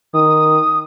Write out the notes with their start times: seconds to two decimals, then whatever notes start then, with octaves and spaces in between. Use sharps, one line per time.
0.14 D#3 D#6